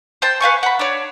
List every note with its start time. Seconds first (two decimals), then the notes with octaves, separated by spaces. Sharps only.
0.22 C5 G5 A5
0.41 B4 F5 G#5 C#6
0.63 F#5 B5
0.79 D4 C#5